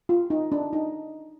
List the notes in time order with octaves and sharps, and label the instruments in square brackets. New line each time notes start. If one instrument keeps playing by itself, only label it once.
[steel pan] F4
D#4
D4
D#4